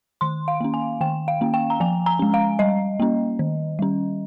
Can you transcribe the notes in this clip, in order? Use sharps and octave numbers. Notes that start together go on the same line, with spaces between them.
D#3 C6
F5
A#3 C#4
G#5
D#3 G5
F5
A#3 C#4
G5
A#5
F3 G#5
A#5
G#3 C#4
F5
G3 D#5
A#3 C#4
D#3
G3 C#4